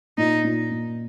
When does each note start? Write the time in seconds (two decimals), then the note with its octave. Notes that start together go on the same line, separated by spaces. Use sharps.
0.18 A#2 D#4
0.44 A#2
0.71 A#2